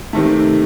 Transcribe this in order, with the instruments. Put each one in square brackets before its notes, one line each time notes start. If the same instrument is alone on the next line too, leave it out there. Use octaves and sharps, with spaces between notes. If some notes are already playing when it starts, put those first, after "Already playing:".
[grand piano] C3 D#3 A3